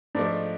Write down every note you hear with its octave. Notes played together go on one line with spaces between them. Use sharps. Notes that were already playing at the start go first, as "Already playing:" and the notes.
G#2 F3 A3 D4